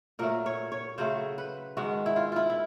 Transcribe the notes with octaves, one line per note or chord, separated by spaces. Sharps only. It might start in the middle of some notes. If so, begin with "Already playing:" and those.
A#2 F#3 A3 A#4
C#5
C#5
C#3 F#3 A3 C5
B4
G#2 D#3 G#3 F#4
E4
F4
E4 F4
E4